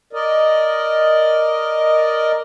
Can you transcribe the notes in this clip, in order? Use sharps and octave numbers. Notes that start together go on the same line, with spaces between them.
A#4 D5 D#5